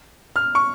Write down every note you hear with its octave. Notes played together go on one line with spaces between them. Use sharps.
F6
C#6